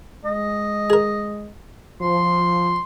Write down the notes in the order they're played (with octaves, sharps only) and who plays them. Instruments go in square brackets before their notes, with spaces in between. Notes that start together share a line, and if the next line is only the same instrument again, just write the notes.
[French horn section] G#3 [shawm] D#5
[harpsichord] G#4 A#4
[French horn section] F3 [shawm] C6